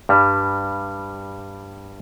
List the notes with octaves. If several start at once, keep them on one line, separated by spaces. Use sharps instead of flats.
G2 G3